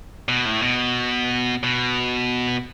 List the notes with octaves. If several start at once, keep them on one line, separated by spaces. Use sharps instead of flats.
B2
A2
B2
B2